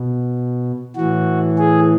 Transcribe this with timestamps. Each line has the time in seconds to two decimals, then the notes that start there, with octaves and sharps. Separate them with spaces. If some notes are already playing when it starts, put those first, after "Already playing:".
Already playing: B2
0.96 A2 E3 F#4
1.58 G#4